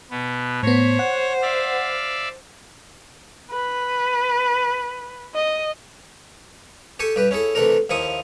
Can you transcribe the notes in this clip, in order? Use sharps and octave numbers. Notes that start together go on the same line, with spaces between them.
B2 B3
A2 B3 C5 C#5
F#5
D5 E5 F5
B4
D#5
G4 A4 G#5 A5 C#6
G2 G4 B4
C#4 E4 G#4 A4
C3 E3 A3 D4 A4 A#4
D#2 F3 A#3 E4 C#6 D#6